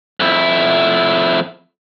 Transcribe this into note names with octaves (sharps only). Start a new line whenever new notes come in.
F2 E4